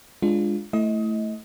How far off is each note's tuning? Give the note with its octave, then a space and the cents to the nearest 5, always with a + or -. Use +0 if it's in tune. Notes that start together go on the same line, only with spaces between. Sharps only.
G#3 +0 D4 +0 F4 -5
A3 +0 E4 +0 D#5 +25